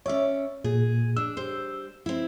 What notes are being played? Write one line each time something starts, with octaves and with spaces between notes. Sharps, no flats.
C#4 C#5 D5 E5
A#2 G#4
D4 E6
G3 C5
C4 E4